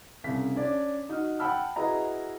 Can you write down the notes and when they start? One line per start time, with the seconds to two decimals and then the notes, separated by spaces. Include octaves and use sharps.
0.24 C2 C#3 B6
0.56 C#4 D4 D5
1.09 D#4 F#4 F6
1.39 F#5 G5 A5 B5 E6 F6
1.76 E4 F#4 G#4 B4 D#5 A#5